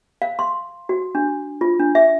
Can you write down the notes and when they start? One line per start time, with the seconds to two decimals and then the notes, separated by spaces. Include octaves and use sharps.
0.22 F5
0.39 C6
0.89 F#4
1.15 D4
1.61 F4
1.80 D4
1.95 E5